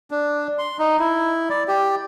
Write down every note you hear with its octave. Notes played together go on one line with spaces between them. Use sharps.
D4
C6
D#4
E4
D5
G4